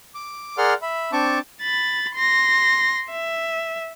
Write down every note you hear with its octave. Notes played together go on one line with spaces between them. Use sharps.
D6
G#4 A#4 D5 F#5 C6 F6
E5 B5
C4 D4 A5 C#6 D6
B5 A6
C6 A#6
E5